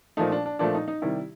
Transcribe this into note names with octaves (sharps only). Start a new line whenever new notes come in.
A#2 F3 A3 D#4
D4
D4
A#2 F3 A3 D4
D#4
D#4
C3 D#3 G3 E4